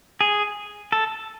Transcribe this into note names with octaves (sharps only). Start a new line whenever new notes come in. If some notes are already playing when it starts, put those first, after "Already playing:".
G#4
A4